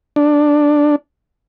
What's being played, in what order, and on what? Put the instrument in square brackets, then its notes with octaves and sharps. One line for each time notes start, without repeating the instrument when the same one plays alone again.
[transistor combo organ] D4